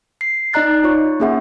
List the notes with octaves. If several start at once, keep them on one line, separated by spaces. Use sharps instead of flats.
C7
D#4 D5 D#5 A#5 F#6 A6
F4 C#5 C#6
A#3 C#4 G#4 E5 F#5